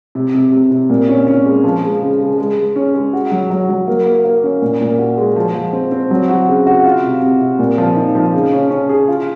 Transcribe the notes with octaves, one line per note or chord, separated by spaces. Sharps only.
C3
C3
C3
C3
A#2
C#4
C#4
G#3
F3
G#3
C#3
G#3
G#3
G#3
C#4
G#3
F#4
F#3
F#3
F#3
A#3
A#3
A#3
C#4
A#2
A#2
F#4
G#3
F3
F3
C4
C4
F#3
F#4
C#3
F#4
F4
C3
C3
C3
A#2
F3
D#4
F3
C#3
C#4
C#4
G#4
F4